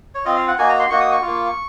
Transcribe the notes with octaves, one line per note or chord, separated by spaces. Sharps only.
C#5
C4 F4 D#5
F5
F#5
A#3 D#4 F#4 G#5
A#5
C6
A#3 D#4 F#4 C#6
D#6
C#6
A#3 F4